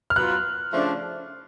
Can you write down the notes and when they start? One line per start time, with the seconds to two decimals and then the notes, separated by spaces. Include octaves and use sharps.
0.10 F6
0.16 F#3 B3 F4 F#6
0.73 C#3 F3 A3 D4